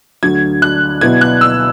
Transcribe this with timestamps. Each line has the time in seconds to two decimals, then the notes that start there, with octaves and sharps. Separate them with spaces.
0.23 D2 D3 F#3 G#6
0.62 F#6
1.01 B2 F#3 B3 E4 G#6
1.21 F#6
1.41 E6